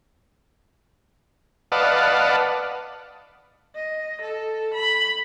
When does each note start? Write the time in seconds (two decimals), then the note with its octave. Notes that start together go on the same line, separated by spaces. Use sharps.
1.72 B4 D5 D#5 F5 F#5 A5
3.75 D#5
4.21 A4
4.74 B5